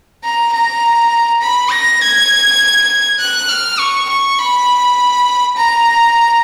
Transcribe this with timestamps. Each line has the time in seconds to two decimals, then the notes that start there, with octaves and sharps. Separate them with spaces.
0.24 A#5
0.53 A#5
1.42 B5
1.71 A#6
2.01 G#6
3.20 F#6
3.49 F6
3.79 C#6
4.09 C#6
4.38 B5
5.57 A#5